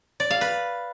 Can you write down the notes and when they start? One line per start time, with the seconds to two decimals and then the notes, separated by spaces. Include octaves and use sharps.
0.20 D5
0.31 F5
0.41 B4